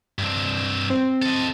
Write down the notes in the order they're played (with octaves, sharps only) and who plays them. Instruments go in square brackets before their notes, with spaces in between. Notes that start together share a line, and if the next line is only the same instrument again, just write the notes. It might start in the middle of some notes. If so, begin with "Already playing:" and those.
[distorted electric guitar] G2 C4
[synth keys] C4
[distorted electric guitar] A4 D#5